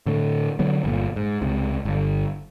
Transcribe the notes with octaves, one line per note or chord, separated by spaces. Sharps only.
A2 D3 A3
D3 F#3 B3
G1 A#2
G#2
C#2 C3
G1